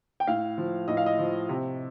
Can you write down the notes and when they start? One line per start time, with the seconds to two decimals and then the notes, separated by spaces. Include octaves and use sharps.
0.20 G5
0.27 A2 F5
0.58 F3
0.88 A2 D#5
0.97 F5
1.06 D#5
1.19 F3
1.49 C3